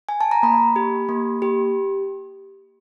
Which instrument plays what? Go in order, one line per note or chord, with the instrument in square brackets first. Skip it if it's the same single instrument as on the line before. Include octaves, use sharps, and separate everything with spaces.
[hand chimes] G#5
A5
A#5
A#3 B5
G4
A#3
G4